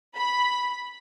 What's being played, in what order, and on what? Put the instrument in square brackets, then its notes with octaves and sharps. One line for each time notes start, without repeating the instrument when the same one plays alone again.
[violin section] B5